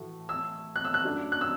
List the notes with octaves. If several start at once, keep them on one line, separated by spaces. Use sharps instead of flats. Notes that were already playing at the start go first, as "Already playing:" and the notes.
Already playing: A2 E3 A3 F#4
E6
F#6
E6
F#6
F#2 F#3 A3 D4
F#6
E6